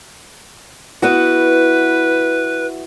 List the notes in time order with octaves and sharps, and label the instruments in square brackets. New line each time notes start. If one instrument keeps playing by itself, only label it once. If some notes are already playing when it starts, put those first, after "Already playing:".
[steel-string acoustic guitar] B3 E4 F#4 [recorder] B4